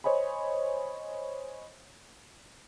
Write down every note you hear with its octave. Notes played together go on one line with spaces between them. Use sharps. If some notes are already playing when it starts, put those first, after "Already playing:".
C5 C#5 D#5 G#5 B5